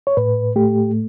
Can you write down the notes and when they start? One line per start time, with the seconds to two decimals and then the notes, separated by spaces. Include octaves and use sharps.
0.07 C#5
0.17 A2 B4
0.56 A3 G4